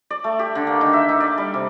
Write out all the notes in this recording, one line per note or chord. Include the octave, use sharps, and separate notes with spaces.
D5
A3
G4
D3
A#3
D#3
E5
D#4
D5
G3
C3